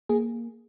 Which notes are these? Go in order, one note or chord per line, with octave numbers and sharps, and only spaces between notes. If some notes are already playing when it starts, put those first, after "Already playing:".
A#3 G#4